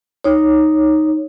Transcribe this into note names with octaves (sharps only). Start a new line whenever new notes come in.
D#4 C#5